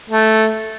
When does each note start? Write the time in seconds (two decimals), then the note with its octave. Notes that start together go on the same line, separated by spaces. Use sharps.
0.10 A3